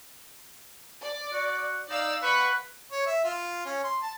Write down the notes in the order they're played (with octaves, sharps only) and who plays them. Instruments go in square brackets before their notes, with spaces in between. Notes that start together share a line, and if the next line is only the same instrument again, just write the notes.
[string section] D5
[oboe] F#4
[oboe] D#4 [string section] D5 F5 E6
[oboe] B4 [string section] F#5 B5 C#6
[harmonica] C#5
E5
F4
C#4
C6
A5